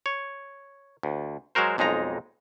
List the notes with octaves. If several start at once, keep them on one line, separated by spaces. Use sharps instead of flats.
C#5
D2
F#3 G#3 F#4 A#4 C5
B1 F2 G#3 D#4 A#5